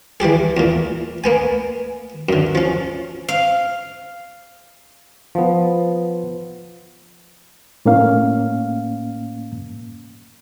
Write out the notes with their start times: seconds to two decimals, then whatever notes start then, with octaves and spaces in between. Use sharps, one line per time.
0.20 E3 G3 G4 G#4
0.57 E2 A#2
1.24 A#3 B3 G#5
2.29 F#2 D3
2.55 F3 C#4
3.28 F5
5.35 F3 B3
7.85 A2 A#3 C#4 F5